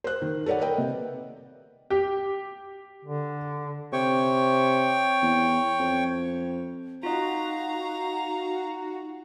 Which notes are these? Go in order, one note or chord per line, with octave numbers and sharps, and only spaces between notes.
C5 F#6
D#3
A4 B4 C#5 D5 F#5
A#4 B4 D#5 G5
C3
G4
D3
C3 C#5 G5 C#6
E2
F2
D#4 F4 F#4 D#5 F5 A#5